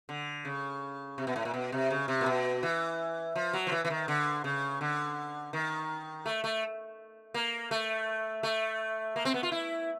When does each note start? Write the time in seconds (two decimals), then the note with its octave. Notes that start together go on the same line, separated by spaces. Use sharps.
0.09 D3
0.45 C#3
1.18 C3
1.27 B2
1.36 A2
1.45 A#2
1.54 B2
1.72 C3
1.91 C#3
2.08 C3
2.21 A#2
2.26 B2
2.63 E3
3.36 F3
3.53 F#3
3.67 F3
3.72 E3
3.85 E3
3.90 D#3
4.08 D3
4.44 C#3
4.81 D3
5.53 D#3
6.26 A3
6.44 A3
7.34 A#3
7.71 A3
8.43 A3
9.16 A#3
9.25 C4
9.34 B3
9.43 F4
9.52 E4